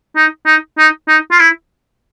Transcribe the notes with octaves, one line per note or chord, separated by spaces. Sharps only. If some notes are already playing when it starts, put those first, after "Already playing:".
D#4
D#4
D#4
D#4
F4
E4